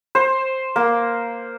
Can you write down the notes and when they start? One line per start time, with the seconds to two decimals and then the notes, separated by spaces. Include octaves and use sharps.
0.15 C5
0.76 A#3